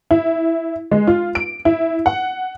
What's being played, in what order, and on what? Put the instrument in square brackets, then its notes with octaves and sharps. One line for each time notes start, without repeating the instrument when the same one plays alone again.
[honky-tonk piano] E4
G#3
F4
D7
E4
F#5